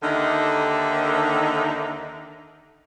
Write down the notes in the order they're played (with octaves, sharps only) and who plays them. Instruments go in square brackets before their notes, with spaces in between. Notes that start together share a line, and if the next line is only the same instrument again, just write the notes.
[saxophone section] D#2 D3 D#3 D#4 A4 E5